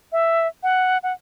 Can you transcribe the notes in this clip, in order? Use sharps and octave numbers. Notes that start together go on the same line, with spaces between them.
E5
F#5
F#5